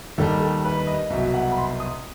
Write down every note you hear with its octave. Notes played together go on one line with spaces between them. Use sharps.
D#2 D#3 G3 A4
A4
B4
D#5
C2 B2 F#3 E5
E5
F#5
B5
C6
D#6